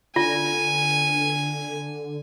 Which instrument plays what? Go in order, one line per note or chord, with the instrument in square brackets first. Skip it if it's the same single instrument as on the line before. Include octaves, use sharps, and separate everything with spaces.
[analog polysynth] D3 [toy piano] F4 [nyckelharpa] G#5